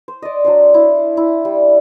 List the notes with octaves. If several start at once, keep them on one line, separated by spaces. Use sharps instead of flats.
C5
D5 D#5
F#3 D4 C5
E4
E4
G3